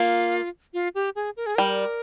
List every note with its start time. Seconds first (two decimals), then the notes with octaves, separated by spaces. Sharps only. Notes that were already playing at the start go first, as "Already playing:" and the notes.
Already playing: A#3 F4
0.74 F4
0.95 G4
1.16 G#4
1.37 A#4
1.46 G#4
1.55 G3 A#4